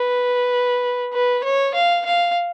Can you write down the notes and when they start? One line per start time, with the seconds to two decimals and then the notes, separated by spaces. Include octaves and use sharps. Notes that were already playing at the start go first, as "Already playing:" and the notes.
Already playing: B4
1.13 B4
1.44 C#5
1.75 F5
2.06 F5